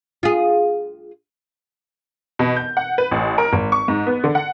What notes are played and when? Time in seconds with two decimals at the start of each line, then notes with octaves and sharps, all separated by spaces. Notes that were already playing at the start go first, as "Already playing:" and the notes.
0.23 F4 G#4
2.39 B2
2.56 G6
2.77 F#5
2.98 B4
3.11 A1
3.38 A#4
3.53 G#1
3.72 C#6
3.88 G#2
4.07 B3
4.24 D3
4.35 F#5